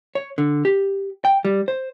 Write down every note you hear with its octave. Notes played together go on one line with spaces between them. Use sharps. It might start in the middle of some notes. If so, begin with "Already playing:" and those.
C#5
D3
G4
G5
G3
C5